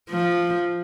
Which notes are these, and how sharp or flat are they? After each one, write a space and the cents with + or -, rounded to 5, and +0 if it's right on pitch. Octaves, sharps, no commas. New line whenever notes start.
F3 -5